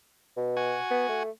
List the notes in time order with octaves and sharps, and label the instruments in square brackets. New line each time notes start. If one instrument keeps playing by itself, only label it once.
[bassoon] B2
[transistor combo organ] F#4 G#5
[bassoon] B3
A3